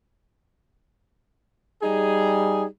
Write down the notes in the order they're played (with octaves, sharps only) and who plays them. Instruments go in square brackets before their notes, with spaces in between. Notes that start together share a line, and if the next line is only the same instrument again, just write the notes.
[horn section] G3 D#4 G#4